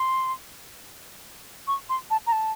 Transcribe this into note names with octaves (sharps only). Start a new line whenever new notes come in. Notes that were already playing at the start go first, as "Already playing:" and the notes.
Already playing: C6
C#6
C6
A5
A#5
A5